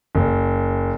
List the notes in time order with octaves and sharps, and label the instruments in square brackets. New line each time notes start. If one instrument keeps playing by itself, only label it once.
[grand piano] F#1